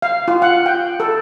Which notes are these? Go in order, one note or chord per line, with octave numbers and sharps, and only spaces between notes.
F5
F4
F#5
G5
A4